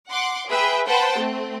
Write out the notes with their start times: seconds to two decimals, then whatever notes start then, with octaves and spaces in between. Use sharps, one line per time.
0.10 F#5 C6 D6
0.49 G#4 B4 E5 G5
0.88 B4 C5 F#5 G5 A5
1.18 A3 C4